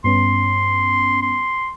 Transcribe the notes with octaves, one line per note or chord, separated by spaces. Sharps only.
G2 B3 C#4 C6
C6